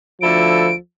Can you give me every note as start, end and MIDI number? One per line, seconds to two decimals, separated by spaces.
0.21 0.68 38
0.21 0.76 53
0.21 0.68 64
0.21 0.68 69
0.21 0.75 98